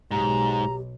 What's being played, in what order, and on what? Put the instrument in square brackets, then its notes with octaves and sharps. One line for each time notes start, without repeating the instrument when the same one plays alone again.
[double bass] B1 [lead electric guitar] G#2 [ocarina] G4 [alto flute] A#5